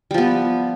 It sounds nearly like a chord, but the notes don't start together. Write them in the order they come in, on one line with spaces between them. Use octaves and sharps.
G3 F3 B3